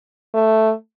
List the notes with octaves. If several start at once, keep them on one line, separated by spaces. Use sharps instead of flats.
A3